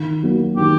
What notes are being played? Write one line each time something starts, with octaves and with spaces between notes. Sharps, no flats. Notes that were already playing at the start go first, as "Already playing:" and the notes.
Already playing: D#3
F#3 A#3 F#4
D#3 G4